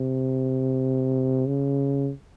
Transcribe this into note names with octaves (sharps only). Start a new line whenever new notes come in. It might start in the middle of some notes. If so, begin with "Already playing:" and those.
Already playing: C3
C#3